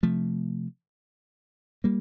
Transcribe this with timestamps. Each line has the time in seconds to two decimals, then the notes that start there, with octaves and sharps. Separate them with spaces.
0.03 C3 F3 A3
1.84 G3 A#3